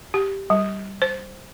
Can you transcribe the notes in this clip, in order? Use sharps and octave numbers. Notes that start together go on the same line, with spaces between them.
G4
G3
C5